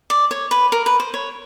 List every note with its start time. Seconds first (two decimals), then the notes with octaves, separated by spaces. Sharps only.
0.10 D5
0.31 C#5
0.51 B4
0.72 A#4
0.86 B4
1.00 C5
1.14 C#5